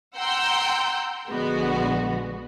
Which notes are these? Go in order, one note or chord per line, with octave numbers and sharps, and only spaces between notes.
F#5 G5 A#5 C6 E6 G6
A#1 D3 F3 G#3 B3 F#4